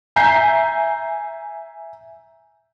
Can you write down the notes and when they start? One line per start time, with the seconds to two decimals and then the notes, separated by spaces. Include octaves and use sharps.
0.16 E5 G#5 A#5 G6 C7